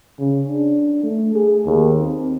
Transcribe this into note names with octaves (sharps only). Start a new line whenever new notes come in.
C#3
D4
A3
G#4
D#2
C4